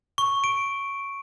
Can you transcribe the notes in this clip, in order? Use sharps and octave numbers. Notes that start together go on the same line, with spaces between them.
C#6
D7